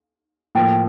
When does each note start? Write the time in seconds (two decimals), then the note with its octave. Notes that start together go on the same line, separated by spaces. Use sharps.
0.55 A2 F3 A#3 G5